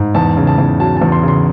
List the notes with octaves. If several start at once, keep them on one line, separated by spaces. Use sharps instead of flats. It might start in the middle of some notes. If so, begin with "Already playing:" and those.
Already playing: G#2
E2 A5
C#3
A5
E2
F#3 A5
E2 A5
C6
C#3 C6